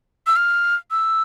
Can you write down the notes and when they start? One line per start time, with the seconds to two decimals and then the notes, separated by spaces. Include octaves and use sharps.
0.27 E6
0.36 F6
0.91 E6